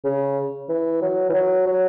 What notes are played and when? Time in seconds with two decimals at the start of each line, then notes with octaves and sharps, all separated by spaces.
0.04 C#3
0.69 E3
1.02 F#3
1.29 E3
1.34 F#3
1.67 F#3